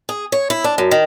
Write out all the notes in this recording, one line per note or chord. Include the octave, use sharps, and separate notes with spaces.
G#4
C#5
E4
D4
F#2
D#3